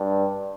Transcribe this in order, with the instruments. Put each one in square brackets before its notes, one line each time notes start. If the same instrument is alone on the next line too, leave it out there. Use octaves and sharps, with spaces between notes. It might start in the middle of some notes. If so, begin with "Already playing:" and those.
Already playing: [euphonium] G2